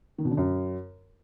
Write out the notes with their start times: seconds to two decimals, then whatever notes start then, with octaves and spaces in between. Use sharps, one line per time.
0.18 D#3
0.25 B2
0.31 D3
0.37 F#2